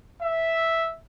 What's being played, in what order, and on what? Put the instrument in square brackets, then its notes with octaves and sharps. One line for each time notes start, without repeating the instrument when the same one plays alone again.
[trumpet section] E5